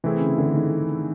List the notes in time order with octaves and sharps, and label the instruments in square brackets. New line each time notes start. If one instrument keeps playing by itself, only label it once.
[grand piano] C3 [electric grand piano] E3 A3 C4 E4 G#4
[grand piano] C#3
D3
D#3